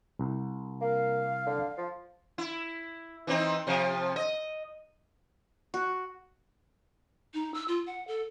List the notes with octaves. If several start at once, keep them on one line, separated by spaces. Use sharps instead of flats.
C2
A#3 F5
D3
F3
E4
E3 C4 D#4
C3 F3
D#5
F#4
D#4
E6
F4
F#5
A4